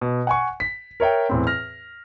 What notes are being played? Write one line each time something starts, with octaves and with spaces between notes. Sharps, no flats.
B2
F#5 G#5 C#6
B6
A#4 C#5 E5 G5
E2 A2 C4
F6 A#6